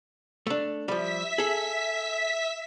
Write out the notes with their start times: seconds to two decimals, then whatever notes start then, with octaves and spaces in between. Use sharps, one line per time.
0.47 A3 D4
0.88 F3 G3 E5 B6
1.38 G#4 A4